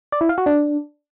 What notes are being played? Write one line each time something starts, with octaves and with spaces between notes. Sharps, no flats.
D5
E4
F5
F#4
D4